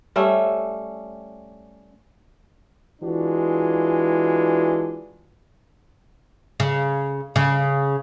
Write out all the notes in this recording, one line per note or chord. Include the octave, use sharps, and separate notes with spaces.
G3 A3 C#4 E5
E3 G#3 D4 F4 F#4
C#3
C#3